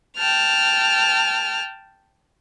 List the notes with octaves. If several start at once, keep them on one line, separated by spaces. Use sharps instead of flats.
G5 A5 F6